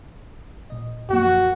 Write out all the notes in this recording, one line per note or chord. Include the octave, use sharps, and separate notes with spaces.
A#2 D#5
F#2 F3 A#3 F#4